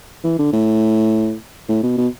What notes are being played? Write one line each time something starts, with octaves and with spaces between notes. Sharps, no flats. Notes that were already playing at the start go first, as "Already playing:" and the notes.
E3
D3
A2
A2
B2
B2